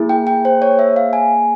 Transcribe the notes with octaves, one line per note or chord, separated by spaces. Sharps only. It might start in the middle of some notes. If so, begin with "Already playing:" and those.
Already playing: A#3 E4 G#4
G5
G5
C5
C#5
E5
F5
G#5